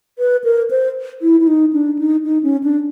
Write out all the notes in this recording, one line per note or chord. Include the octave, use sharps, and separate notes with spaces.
B4
A#4
C5
E4
E4
D#4
D4
D#4
D#4
C#4
D4